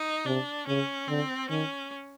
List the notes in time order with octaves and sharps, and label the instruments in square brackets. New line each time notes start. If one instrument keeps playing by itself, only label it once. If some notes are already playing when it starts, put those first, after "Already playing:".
Already playing: [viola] D#4
[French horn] C3 [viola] D4
[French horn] C#3 [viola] C#4
[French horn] D3 [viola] C4
[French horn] D#3 [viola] C#4